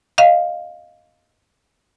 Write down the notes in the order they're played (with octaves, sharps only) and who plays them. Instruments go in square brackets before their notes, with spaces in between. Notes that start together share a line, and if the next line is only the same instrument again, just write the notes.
[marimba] D#5 F5